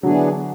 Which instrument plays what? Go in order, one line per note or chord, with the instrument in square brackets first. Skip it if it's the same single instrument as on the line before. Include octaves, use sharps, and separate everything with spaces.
[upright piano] D3 F#3 [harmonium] E3 B3 D4 G#4